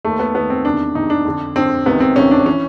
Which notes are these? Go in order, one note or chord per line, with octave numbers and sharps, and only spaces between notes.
D#2 D#3 A3
B3
D#2 D#3 B3
C4
E2 C3 D#3 D4
E2 C3 D#3 D#4
D4
F2 D3
F2 D3 C4
C#2 C3 D#3 B3
C4
C#2 C3 D#3 C#4
D4
E3 C#4